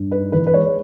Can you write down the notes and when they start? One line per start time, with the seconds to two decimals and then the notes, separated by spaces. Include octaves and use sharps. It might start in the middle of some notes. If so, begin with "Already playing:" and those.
Already playing: G2
0.11 D#4 B4
0.32 E3 B4
0.47 B4
0.54 G#3 C#5